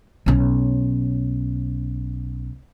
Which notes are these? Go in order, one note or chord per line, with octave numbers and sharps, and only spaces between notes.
B1 C#4